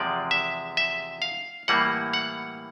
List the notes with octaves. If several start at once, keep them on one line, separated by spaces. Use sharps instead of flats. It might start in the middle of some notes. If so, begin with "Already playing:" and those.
Already playing: E2 C3 F3 G#3 D5
E5
E5
F5
A2 E3 G3 A#3 F#5
F#5